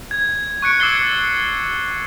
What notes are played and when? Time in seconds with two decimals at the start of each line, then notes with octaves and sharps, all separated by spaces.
0.11 G#6
0.62 C#6 F#6 C#7 D7
0.80 D6 E6 G#6 A6 C7 G7